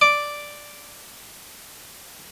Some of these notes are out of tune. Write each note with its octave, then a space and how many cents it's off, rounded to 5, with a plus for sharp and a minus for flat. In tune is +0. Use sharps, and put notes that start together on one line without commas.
D5 +0 D6 +0